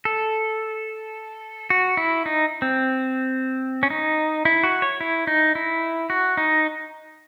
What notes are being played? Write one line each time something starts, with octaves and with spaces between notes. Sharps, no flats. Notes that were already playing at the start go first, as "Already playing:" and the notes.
A4
F#4
E4
D#4
C4
C#4
D#4
E4
F#4
C#5
E4
D#4
E4
F#4
D#4